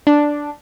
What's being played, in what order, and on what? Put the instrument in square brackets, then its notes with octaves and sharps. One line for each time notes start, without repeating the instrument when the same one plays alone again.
[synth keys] D4